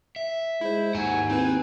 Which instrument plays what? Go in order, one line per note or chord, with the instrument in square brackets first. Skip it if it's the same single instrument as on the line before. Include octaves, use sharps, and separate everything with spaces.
[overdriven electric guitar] E5
[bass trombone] G#3 [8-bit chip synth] E4 C5
[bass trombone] D#2 [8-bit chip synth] G#2 [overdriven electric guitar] F#5 A#5 [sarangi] G#5
[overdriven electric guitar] C4 [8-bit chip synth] D#4 E4 B4